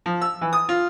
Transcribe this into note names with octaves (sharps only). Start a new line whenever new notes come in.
F3
E6
E3
D#6
F4